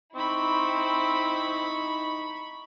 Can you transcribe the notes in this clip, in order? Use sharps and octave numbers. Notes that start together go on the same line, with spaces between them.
C4 D#4 E4 B5 C#6